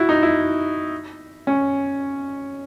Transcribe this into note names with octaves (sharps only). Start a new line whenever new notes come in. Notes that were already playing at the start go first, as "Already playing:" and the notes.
Already playing: E4 F#4
D#4
E4
C#4